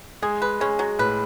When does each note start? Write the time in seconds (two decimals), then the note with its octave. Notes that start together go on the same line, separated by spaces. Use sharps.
0.22 G#3 G#4
0.42 B4
0.60 G#3 C#4
0.79 F#3
0.99 A2 B4